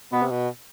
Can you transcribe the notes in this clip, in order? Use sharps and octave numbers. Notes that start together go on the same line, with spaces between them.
B2 B3
C3
B2